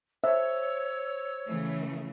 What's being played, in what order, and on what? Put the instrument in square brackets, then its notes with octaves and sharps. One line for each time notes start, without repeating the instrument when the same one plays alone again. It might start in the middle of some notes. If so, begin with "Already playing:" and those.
[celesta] C5 [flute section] C#5 E6 [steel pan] E5
[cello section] C#3 E3 A3